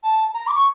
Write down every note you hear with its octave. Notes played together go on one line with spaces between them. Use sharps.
A5
A#5
D6
C#6